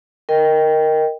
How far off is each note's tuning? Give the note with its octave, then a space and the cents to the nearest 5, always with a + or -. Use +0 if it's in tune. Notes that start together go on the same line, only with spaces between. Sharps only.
A#4 +0 D#5 +0 G5 +0